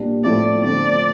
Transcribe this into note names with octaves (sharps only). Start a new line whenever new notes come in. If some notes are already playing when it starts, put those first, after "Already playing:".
Already playing: A#2 G3 A#3 D4
A2 F3 A3 C4 E4 D5
D3 F3 A3 C4 D5